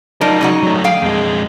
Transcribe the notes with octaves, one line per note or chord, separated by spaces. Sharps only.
F3 F#3 D#4 A#4 D5
C#3 D#4 F#4
F#3 A3
G#4 F5 G5
F2 G#3